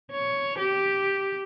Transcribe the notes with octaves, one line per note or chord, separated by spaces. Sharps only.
C#5
G4